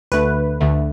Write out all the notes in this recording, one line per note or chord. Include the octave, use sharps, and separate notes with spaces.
D2 D3 A3 B4
D2 D3 A3